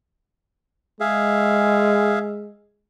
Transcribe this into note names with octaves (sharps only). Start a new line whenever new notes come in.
G#3 G#4 E5 F5